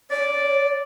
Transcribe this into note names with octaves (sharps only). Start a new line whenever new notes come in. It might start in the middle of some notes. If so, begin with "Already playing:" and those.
C#5 D5